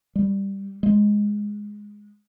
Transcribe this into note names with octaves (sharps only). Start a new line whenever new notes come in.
G3
G#3